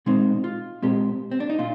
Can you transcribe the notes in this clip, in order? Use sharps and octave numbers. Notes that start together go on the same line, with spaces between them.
A#2 G#3 C4 D#4
F4
A#2 G#3 C4 G4
C4
D4
D#4
A#2 F4